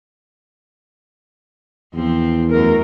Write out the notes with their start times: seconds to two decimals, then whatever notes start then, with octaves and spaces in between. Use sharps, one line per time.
1.94 E2 F3 C4
2.51 F#2 A3 A#4